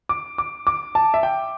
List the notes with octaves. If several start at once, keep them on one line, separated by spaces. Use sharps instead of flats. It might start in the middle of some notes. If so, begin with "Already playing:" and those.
D6
D6
D6
A5
E5
G5